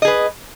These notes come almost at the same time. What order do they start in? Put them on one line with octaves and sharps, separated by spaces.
D#5 G#4 B4